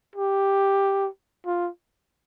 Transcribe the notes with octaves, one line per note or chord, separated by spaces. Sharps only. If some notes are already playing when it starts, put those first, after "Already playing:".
G4
F4